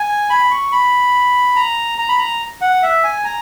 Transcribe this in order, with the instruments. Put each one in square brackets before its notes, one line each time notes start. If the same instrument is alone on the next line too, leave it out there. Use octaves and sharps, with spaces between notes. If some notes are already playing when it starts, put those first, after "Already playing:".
Already playing: [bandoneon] G#5
B5
C#6
B5
A#5
A#5
B5
A#5
F#5
E5
G#5
A#5